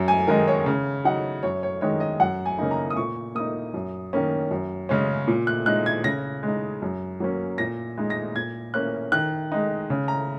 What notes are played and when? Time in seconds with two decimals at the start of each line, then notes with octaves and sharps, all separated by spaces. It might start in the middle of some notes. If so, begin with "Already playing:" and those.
Already playing: F#2
0.08 G#5
0.27 D#3 G#3 D#4 A#4
0.48 C#5
0.66 C#3
1.05 F#3 D#4 F#5
1.43 F#2 C#5
1.63 C#5
1.81 D#3 G#3 D#4 C#5
2.00 D#5
2.20 F#2 F#5
2.46 G#5
2.59 C#3 A#3 D#4
2.71 A#5
2.90 D#6
2.96 A#2 C#6
3.35 A#3 D#4 D#6
3.74 F#2
4.13 D#3 A#3 C#4
4.51 F#2
4.89 C#3 G#3 C#4
5.28 A#2
5.47 F#6
5.66 G#3 D#4 F#6
5.86 G#6
6.04 C#3 A#6
6.43 G#3
6.48 D#4
6.82 F#2
7.20 F#3 A#3 C#4
7.58 A#2 A#6
7.97 G#3 D#4
8.10 A#6
8.36 A#2 G#6
8.74 A#3 C#4 F#6
9.12 D#3 F#6
9.52 G#3 D#4
9.90 C#3
10.08 A#5